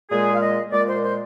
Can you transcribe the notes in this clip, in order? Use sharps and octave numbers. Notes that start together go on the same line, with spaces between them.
A#2 G#3 G#4
F5
D#5
A#2 G#3 D5
C5
C5